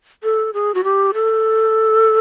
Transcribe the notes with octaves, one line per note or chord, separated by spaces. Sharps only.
A4
G#4
F#4
G4
A4